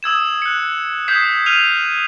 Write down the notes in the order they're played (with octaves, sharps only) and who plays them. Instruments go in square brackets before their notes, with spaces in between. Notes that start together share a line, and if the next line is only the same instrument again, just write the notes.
[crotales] D#6 E6 G#6 E7
F#6 C#7
D#6 G6 G#6 B6 C7 E7
F6 D#7 F7